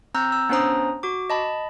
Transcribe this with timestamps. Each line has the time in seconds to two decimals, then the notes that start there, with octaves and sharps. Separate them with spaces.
0.14 C4 A#5 E6 G6
0.32 E6
0.49 B3 C#4 D4 C5 A#5 D#6
1.03 F#4 D6
1.30 D#5 A5 B5